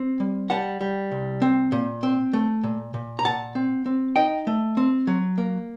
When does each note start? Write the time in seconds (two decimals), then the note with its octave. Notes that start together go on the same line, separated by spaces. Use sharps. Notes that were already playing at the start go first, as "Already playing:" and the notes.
Already playing: C4
0.20 G3
0.50 G3 F#5 A5
0.81 G3
1.11 C2
1.42 C4
1.72 A#2
2.03 C4
2.33 A3
2.63 A#2
2.94 A#2
3.19 A#5
3.25 A#2 F#5 A5
3.55 C4
3.86 C4
4.16 D#4 D#5 G5
4.47 A3
4.77 C4
5.07 F#3
5.38 A#3